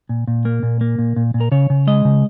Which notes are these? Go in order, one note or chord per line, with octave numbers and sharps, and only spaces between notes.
A#2
A#2
A#3
A#2
A#3
A#2
A#2
A#2
A#4
C#3 C#5
C#3
G#3 D#5
C#3